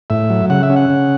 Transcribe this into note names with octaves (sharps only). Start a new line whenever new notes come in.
A2 E5
F#3
C#3 F#5
E5
C#4
F#5
C#3